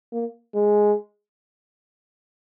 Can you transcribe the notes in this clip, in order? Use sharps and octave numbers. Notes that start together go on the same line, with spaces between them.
A#3
G#3